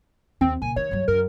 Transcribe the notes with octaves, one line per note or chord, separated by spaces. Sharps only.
D#2 C4
A#2 C#3 G#5
D#3 C#5
G2 F#3
F#2 A#4